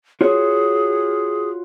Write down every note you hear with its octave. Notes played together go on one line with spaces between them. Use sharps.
F4 F#4 G#4 C#5